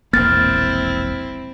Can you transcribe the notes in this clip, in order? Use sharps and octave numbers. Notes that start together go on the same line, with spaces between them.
E1 A#1 A#3 C4 E4 F6 A6